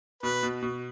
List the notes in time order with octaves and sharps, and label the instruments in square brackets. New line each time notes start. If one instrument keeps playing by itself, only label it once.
[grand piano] B2 [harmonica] B4
[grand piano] B2
B2